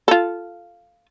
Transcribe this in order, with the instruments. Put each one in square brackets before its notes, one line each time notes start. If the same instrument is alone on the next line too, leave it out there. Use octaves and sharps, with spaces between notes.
[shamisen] F4 A4